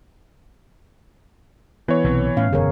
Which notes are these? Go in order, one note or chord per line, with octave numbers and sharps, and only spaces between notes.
E3 B3 C#5
B1 C3 C4
A2 C#4 F5
E1 F#2 D3 G#4 A#4 C#5